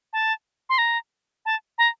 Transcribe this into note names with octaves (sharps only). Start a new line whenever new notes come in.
A5
C6
A#5
A5
A#5